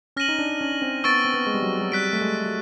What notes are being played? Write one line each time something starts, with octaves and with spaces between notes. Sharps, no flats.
C#4 F6 A#6 D#7 F#7
D#4
D4
C#4
C4
B3 C#6 E6 A6 D7
C4
B3
G#3
G3
F#3
F#3
G3 F#6 B6 D7
A3
G#3
F#3